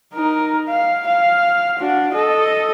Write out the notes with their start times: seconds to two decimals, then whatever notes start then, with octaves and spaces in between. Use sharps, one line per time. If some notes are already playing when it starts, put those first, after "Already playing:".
0.14 D#4 A#4
0.69 F5
1.07 F5
1.79 D4 F#4
2.13 A4 D#5